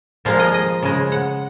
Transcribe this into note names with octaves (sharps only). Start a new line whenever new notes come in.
A#2 F3 G#3 F5
D#5
D#5
C#3 G#3
F#5